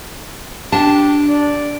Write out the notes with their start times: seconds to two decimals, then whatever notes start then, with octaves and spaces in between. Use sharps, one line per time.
0.72 D4 G4 A5
1.28 D5